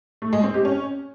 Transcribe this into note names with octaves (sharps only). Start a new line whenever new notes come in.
A3
G#3
C4
G4
C#4